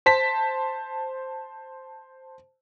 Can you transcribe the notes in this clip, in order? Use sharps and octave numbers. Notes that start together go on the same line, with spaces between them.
C5 A5 B6